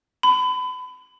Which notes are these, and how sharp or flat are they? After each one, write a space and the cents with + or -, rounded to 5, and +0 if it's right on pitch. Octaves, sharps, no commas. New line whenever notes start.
B5 +30